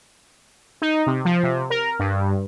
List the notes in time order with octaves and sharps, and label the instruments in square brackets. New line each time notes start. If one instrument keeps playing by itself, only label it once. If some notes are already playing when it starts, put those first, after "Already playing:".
[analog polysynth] D#4
C3
F3
C3
A#4
G2